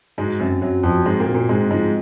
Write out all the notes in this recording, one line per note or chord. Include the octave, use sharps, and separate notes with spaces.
G#2 G#3 F#4
F#2 F#3 C4
F#2 F#3 F#4
F2 F3 F#4
G#2 G#3 C4
A#2 A#3
F#4
A#2 A#3
G#2 G#3 C4
G#2 F3 G#3